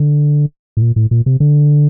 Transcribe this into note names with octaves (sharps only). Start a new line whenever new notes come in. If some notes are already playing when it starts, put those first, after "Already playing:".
Already playing: D3
A2
A#2
A2
A#2
C3
D3